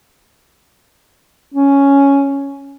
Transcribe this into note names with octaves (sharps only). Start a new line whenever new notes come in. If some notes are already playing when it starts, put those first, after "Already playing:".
C#4